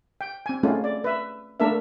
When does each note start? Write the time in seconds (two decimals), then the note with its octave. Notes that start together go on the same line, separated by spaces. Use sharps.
0.21 G5
0.46 C4 G#5
0.63 G#3 A3 C4 C#4 F4
0.84 D5
1.04 B4 E5
1.60 A3 A#3 D4 A4 A#4 E5